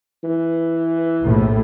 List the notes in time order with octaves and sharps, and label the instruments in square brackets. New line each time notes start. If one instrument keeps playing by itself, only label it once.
[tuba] E3
[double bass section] A#1 D#2 A2